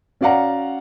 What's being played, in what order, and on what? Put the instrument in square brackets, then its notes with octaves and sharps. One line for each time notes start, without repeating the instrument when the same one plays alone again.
[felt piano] C#4 F#4 D5 F5 F#5 A#5